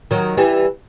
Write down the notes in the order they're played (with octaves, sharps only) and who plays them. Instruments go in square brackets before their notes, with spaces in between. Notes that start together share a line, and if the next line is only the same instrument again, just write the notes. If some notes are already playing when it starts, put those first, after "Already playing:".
[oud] D#3 F#3
E3 G3